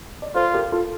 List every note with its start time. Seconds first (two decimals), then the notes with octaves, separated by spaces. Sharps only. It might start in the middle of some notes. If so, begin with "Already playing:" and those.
0.22 D5
0.35 F4 A4 C5
0.54 G4 A#4
0.72 F4 A4